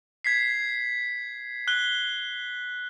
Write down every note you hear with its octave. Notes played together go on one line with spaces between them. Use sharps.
G#6 B6 C7
F#6 G7